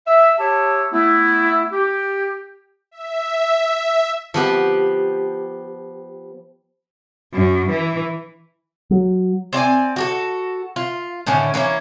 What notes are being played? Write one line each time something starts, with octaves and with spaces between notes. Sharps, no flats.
E5
G4 C#5 E5 A5
A3 B3 E4
G4
E5
F3 B3 G4
F#2
E3
F#3
C4 D5 E5 G#5
F#4 G4 A4
F4
A2 D3 D#3 C#4
E3 A#3 C4 C#4